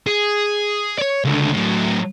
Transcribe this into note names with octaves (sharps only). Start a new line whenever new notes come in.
G#4
C#5 D5
C#2 D3
A2 F#3